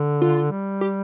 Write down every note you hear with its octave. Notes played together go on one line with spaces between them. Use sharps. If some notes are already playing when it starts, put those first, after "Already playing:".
Already playing: D3
F4
G3
G4